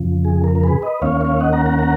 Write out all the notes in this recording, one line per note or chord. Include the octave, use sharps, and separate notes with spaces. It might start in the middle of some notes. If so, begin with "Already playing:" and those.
Already playing: F2 C#3 F3
G#4
A#4
A#4
G#4 B4
B4 D#5
D#2 D#3 A#3 C#4 C#5 F5
C#5 F5
D#5 F#5
F#5 A#5
F#5 A#5
F#5 A#5